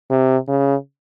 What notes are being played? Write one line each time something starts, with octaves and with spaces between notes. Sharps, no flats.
C3
C#3